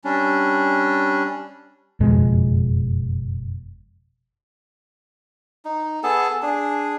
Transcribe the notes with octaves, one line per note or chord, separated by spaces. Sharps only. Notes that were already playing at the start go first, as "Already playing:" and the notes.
G3 C#4 D4
F#1 F2 B2 G#3
D#4
B3 G#4 A4 A5
D4 G#4